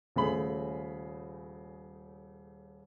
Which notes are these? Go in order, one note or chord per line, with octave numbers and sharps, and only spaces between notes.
D#1 C#3 A3 G#4 B5 F#7